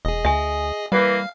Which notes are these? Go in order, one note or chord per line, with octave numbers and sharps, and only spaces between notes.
E1 G#4 D#5
D2 E5 G#5
E3 G3 A#3 B4 F5